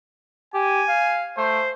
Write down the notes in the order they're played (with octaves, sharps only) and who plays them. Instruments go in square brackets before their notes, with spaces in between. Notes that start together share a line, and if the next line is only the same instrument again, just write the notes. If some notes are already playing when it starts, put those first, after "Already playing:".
[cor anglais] G4 [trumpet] G#5
[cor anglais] F5
[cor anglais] A3 [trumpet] C5